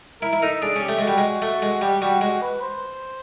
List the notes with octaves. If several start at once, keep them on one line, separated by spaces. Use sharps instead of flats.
E4 A#4
E4
D#4 A4
D4 G#4
C#4
G4
A3
G#3 F#4
G3
G#3
A3
G#3
G3 G4
G3 F#4
G#3 F#4
B4
C5